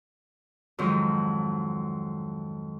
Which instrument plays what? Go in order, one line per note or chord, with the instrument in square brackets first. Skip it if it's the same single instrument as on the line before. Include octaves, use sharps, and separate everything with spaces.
[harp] F2 G#2 D#3 F#3